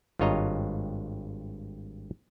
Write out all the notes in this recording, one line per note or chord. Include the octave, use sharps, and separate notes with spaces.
G#1 G2 F4 C#5 D#5 A#5